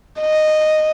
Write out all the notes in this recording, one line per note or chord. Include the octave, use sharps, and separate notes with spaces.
D#5